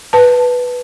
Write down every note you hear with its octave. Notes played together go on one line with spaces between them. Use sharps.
B4 A5